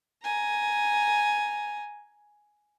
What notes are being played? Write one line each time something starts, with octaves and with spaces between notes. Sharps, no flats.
G#5 A#5